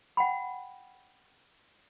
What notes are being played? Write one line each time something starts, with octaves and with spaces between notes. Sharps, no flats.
F#5 G5 B5